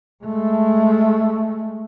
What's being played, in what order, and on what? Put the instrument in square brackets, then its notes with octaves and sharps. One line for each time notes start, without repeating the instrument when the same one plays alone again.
[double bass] G#3 A3